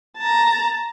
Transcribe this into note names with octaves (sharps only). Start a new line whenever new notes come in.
A5 A#5